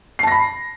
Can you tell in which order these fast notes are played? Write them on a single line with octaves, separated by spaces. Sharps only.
C7 A5 A#6 B5